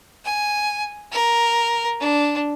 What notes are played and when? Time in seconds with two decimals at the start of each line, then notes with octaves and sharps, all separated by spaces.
0.25 G#5
1.12 A#4
2.00 D4